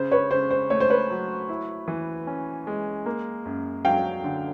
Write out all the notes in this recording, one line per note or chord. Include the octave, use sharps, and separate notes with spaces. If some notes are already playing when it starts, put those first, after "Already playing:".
Already playing: C#3 C5
B4 C#5
C#3 C5
C5
A3 C#5
C5
B4 C#5
F#3
E4
E3
C#4
G#3
A#3
F#2
F#3 F5 G5
D3